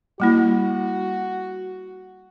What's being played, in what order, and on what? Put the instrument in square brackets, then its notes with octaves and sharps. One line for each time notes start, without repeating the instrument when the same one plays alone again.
[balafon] G3 A#3 E4 [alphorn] F#4